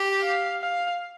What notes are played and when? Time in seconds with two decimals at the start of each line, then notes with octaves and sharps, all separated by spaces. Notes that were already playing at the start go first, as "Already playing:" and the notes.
Already playing: G4
0.22 F5
0.62 F5